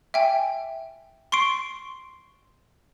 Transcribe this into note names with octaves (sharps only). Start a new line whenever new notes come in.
E5 G5 G#5
C6 C#6 C7 D7